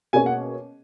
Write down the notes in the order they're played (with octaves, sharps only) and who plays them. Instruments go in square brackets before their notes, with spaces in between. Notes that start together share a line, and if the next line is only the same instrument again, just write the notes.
[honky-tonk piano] B2 A#3 C#4 G#4 C#5 [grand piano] G#5
[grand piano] F#5